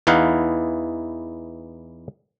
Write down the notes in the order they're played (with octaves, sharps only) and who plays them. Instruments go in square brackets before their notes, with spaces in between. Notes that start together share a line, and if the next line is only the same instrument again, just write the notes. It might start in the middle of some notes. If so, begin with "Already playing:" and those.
[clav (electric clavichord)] E2 E3 D#4 E4 F5 F#5